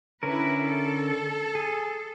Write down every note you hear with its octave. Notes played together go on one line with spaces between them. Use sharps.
D3 C#4 E4 A#4 B4
A4
G#4